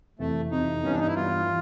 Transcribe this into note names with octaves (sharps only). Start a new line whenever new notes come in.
F2 C3 E3 A3
F2 C3 E3 D#4
G2 E3 G3 B3 C#4
D4
D#4
E4
G2 E3 G3 B3 F4
E3